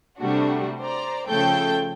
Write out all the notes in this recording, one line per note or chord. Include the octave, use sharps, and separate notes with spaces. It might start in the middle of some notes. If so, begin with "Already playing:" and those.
C3 G3 A3 D4 F#4
C5 D5 A#5
C#3 F3 A3 A4 G5 G6